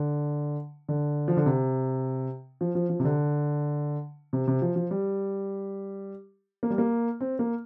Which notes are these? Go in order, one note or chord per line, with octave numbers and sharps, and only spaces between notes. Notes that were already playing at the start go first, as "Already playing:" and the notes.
Already playing: D3
D3
F3
D3
C3
F3
F3
F3
C3
D3
C3
C3
F3
F3
G3
A#3
G3
A#3
C4
A#3